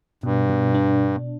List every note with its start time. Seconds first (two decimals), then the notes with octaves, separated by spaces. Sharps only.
0.23 G2 B2
0.50 B2
0.75 D4